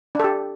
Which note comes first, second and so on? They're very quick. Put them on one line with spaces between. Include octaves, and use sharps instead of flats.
D4 A4 G4